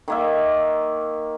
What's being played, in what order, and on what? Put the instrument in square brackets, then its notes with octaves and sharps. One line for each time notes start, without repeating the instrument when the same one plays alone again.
[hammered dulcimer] D#3 A#3 E5